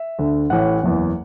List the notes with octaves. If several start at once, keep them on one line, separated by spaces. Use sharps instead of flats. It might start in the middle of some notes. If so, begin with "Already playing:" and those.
Already playing: E5
D2 D3
A1 A2 E3 F#5
F#1 E2 E3